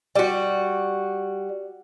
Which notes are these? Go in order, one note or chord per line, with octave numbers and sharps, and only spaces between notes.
G3 F#4